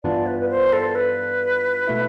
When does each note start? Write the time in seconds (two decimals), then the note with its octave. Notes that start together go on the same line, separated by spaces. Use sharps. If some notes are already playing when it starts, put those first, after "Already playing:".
0.04 G2 E3 B3 D4 F4 D5
0.27 B4
0.40 B4
0.50 C5
0.73 A4
0.95 B4
1.87 B2 A3 E4